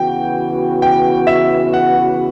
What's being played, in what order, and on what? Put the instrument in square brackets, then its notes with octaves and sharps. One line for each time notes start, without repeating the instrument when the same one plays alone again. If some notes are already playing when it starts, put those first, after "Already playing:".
Already playing: [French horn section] C#3 E3 B3 F#4 [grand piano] G5
[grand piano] G5
E5
F#5